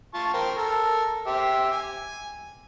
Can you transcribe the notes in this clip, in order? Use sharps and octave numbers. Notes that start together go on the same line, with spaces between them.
F4 A5 C#6
A#4 C5 G5
A4 A#4
G4 C5 E5
G#5